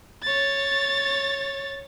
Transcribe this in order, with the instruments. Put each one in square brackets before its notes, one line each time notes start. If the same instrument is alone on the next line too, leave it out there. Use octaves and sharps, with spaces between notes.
[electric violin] C#5 A6